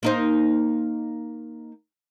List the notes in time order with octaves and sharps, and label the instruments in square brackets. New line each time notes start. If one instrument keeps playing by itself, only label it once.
[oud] A#3 D#4 C5